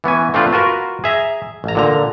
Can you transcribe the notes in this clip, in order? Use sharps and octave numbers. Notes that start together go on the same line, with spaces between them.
E3 B3 C#4 G#5
A3 C4 D4 F4 B4
F4 F#4 A#4 B4
G#4 E5 A#5
A1 A#5
A#2 D3 A#5